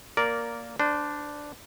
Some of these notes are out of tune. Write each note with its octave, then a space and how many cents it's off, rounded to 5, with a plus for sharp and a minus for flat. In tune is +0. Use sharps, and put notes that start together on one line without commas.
A#3 +0 A#4 +0 D5 -15
D4 +0 C5 -30